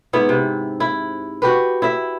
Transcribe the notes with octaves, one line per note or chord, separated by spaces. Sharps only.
G#2 B3 E4
C3
E4
F#4 G4 B4
E4 E5